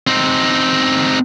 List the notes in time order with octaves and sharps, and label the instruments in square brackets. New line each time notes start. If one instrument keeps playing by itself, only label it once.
[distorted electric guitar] C4 D#4